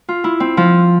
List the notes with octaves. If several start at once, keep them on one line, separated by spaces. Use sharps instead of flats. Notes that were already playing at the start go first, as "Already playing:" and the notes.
F4
E4
C4
F3